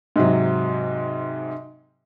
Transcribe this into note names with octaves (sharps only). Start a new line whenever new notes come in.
G#2 C3 F#3